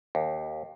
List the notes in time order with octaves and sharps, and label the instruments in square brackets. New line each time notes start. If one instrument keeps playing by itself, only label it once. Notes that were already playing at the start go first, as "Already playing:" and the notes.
[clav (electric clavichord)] D#2